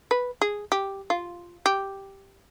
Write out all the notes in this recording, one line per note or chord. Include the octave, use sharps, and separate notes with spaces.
B4
G#4
G4
F4
G4